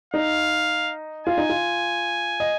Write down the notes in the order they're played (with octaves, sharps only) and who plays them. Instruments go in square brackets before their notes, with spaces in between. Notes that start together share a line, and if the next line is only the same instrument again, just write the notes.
[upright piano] D#4 [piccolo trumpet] F5
[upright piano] F4 [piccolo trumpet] G#5
[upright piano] D#4
F4
D#5